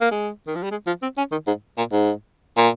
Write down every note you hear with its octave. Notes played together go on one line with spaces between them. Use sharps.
A#3
G#3
D#3
F3
G3
G#3
F3
C4
C#4
D#3
G#2
A#2
G#2
A#2